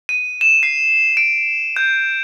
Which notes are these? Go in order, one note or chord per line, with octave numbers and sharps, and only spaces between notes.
D#7
E7
C7
D7
G6